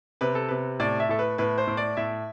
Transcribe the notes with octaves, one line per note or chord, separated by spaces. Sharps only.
C3 B4
A4
C3 B4
A2 D5
E5
A2 A4
B4
A2 B4
C5
A2
D5
A2 E5